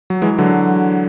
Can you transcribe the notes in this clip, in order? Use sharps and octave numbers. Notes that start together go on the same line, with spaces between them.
F#3
E3 G#3
D3 F#3